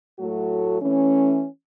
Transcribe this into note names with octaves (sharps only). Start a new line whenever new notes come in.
A2 F#3 A3 F#4 A4
E3 A3 C#4